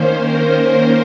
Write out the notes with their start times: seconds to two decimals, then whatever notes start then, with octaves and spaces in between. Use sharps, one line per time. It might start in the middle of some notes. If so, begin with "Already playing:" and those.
Already playing: D#3 A#3 C#4 C5
0.20 A#4
0.56 C5